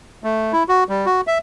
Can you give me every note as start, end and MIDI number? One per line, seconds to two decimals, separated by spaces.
0.24 0.53 57
0.53 0.63 64
0.69 0.84 66
0.89 1.06 55
1.06 1.21 66
1.27 1.38 76